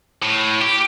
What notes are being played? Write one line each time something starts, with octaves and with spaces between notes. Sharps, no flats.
A2
G4